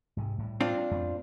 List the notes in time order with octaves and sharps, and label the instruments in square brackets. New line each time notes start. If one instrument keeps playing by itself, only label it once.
[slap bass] G#2 C3 G#3
A2 G3
[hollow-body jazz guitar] C4 D4 F4
[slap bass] F2 A3 B3